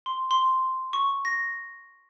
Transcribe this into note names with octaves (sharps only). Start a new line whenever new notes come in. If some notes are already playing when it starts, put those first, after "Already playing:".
C6
C6
C#6
A#6